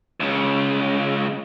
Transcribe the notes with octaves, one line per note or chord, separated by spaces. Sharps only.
C#2 C#3